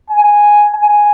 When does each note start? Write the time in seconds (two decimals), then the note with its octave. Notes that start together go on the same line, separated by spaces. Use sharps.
0.10 G#5
0.74 G#5